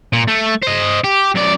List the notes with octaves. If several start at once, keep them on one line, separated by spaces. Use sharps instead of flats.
A#2
A3
C5 D#5
G4
F#2 D5